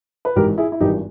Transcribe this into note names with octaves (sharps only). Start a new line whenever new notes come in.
B4
G#1 G#2 E3 G4 A#4
E4 G#4
E4
G#1 G2 E3 D#4 G4